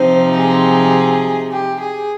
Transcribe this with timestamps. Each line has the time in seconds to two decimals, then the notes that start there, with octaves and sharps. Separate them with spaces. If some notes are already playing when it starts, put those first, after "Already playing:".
Already playing: C3 F3 C4 D#4 C5
0.37 G#4
1.51 G4
1.80 G#4